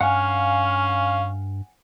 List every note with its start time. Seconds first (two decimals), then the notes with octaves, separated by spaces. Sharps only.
0.01 G2 C#4 F5 F#5 G#5